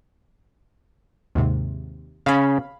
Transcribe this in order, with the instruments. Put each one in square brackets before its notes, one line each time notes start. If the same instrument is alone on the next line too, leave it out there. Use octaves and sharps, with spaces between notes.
[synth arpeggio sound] D#2 G#2 C3
[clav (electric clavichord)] C#3 C#4 [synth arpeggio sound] F5 B5